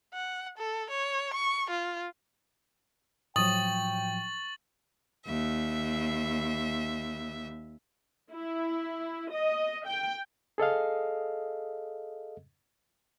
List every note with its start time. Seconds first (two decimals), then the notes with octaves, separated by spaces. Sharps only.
0.14 F#5
0.58 A4
0.90 C#5
1.34 C#6
1.70 F4
3.36 A2 F3 F#3 G5 C#6 D#6 A6 F#7
5.25 D#2 E5
8.31 E4
9.33 D#5
9.85 G5
10.58 G#4 A4 D#5 F5